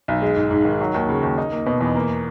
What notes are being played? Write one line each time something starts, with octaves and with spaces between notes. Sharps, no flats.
B1
G#3
G#2
G#2
D#3
F#3
D#2
C#3
D#2
D#4
A#3
B2
E2
A#3